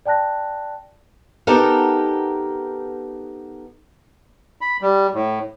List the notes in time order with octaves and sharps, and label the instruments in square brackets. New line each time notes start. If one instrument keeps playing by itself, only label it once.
[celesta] D5 G5 A5 F#6 A#6
[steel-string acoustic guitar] B3 D#4 G4 A4 A#4
[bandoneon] B5
G3
A2